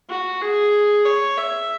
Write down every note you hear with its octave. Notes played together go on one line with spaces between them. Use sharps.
F#4
G#4
C#5
E5